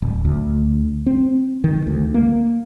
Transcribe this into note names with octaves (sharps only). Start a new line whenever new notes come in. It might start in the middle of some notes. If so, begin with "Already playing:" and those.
D1
D2
C4
D#3
D2
A#3